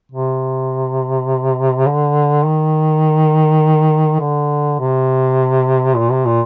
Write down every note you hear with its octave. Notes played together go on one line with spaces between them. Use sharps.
C3
D3
D#3
D3
C3
A#2
C3
A#2